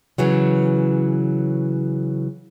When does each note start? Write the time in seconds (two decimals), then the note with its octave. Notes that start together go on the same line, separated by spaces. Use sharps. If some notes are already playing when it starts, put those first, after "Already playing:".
0.18 C#3 E3 F#3